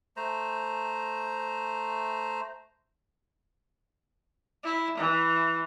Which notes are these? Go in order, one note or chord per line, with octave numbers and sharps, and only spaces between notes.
A3 C5 A#5
E4
E3